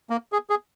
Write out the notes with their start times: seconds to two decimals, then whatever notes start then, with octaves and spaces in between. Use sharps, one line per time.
0.10 A#3
0.32 G#4
0.50 G#4